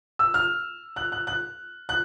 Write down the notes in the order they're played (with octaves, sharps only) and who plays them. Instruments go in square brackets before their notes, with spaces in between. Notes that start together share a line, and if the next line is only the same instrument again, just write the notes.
[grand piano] E6
F6
F#6
F#6
F#6
F#6